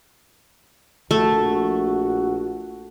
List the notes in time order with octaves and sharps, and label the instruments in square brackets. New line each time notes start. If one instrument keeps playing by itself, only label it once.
[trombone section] A#1 F#4 [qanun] A3